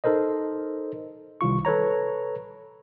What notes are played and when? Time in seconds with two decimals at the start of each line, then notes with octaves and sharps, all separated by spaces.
0.04 D#4 A4 A#4 C5 D#5
1.41 C2 D#3 F4 C#6
1.65 A4 B4 C#5 A#5